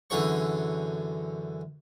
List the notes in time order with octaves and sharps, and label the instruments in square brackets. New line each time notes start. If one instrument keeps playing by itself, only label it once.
[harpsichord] F#2 D3 E3 G#4 C#5 C#6